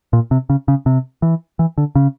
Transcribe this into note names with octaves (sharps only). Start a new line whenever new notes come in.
A#2
C3
C#3
C#3
C3
E3
E3
D3
C#3